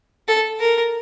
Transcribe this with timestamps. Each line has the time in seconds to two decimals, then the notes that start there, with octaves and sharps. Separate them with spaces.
0.28 A4
0.60 A#4